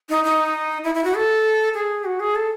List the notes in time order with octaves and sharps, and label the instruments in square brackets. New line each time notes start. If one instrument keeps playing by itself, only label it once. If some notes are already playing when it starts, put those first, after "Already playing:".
[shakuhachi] D#4
D#4
E4
E4
F#4
A4
G#4
F#4
G#4
A4